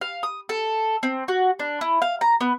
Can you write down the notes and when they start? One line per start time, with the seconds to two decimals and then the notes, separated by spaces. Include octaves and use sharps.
0.01 F5
0.23 D#6
0.49 A4
1.03 C4
1.28 F#4
1.59 D4
1.81 E4
2.02 F5
2.21 A#5
2.41 B3